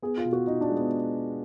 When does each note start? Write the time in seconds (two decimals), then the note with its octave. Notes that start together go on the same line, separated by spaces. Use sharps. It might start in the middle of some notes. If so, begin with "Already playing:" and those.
0.02 B3 G#4
0.17 F4
0.25 B2
0.33 F#4
0.47 B2 D#4
0.61 D4
0.70 G#3
0.77 B3